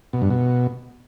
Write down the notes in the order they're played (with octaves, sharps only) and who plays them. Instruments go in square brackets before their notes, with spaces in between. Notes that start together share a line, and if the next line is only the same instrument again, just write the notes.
[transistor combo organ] B2
G2
B2